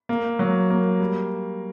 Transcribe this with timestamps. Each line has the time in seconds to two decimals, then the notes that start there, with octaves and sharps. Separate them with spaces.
0.09 A#3
0.39 F#3
0.70 A#3
1.00 G3